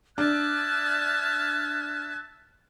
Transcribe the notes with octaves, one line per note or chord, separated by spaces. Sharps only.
D4 E5 A5 F6 F#6 G#6